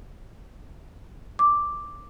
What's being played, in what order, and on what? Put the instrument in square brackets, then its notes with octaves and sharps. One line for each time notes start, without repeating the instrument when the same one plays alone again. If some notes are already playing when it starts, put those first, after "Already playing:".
[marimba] D6